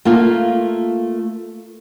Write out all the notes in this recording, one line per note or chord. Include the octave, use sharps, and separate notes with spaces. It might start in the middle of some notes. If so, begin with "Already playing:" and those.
A3 A#3 F4